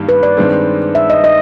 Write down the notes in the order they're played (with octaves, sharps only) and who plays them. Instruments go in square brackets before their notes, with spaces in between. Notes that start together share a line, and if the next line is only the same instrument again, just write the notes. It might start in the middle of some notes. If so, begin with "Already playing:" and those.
Already playing: [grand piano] G2 D#3 G3 A#3
[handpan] B4
D5
[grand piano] G2 D#3 G#3 C4
[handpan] E5
D#5
D#5